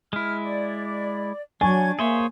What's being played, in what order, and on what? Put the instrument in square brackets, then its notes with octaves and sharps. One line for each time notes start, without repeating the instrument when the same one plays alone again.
[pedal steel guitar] G#3 E4 [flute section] F6
[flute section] D5
[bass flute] F#3 [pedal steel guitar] D4 [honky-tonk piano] G#5 [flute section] C#6 G#6
[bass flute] A#3 [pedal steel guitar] G#4 C5 C#5 [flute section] E5